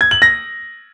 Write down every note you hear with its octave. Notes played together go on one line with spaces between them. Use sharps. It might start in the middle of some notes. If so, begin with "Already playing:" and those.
G#6
F#7
A#6